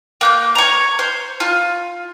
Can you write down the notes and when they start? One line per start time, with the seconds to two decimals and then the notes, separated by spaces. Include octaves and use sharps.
0.21 A#3 F#6 G6
0.55 C#5 A#5
0.99 C5
1.40 F4